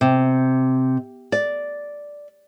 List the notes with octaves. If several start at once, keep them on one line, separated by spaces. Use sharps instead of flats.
C3
D5